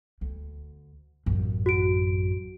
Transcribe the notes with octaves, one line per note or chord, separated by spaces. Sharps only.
D2
A1 F#2
F#4 D7